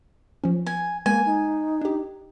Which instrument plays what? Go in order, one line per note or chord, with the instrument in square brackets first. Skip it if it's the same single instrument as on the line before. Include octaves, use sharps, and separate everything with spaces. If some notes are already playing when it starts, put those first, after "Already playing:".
[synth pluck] F3 C#4
[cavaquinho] G#5
[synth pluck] G#3 [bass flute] A#3 [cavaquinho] G#5
[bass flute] D#4
[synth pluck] D4 G4